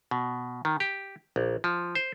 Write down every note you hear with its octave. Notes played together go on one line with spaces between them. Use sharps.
B2
D#3
G4
A#1
F3
C5